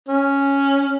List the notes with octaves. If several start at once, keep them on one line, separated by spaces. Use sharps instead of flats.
C#4